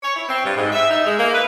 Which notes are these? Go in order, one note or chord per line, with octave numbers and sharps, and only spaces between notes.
C#5
E4
C4
G2
G#2
E5
D#4
G#3
A#3
B4